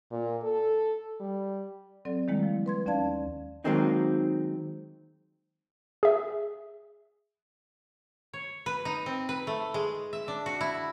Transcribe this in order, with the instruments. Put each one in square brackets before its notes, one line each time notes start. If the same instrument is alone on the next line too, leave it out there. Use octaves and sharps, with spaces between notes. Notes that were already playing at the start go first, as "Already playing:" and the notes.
[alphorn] A#2
A4
G3
[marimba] F#3 C4 A4 D5
D#3 G3 G#3 A#3 E4
F3
B4 C6 G#6
D#2 C#4 D5 F5 A5 G#6
[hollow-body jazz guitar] D#3 F#3 G#3 A#3 C4 D#4
[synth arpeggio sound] G#4 E5
[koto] C#5
B4
D#4
C4
B4
A3
G#3
E5
D4
F#4
E4